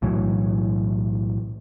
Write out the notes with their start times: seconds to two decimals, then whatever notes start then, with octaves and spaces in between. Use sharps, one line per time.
0.02 B1 A2 E3 F#3